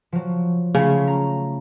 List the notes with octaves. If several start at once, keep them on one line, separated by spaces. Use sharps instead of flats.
F3 F#3
C#3 A3 C#4 F4
A#5